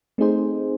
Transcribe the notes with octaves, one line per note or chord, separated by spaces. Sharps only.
A3 C4 D#4 G#4 C5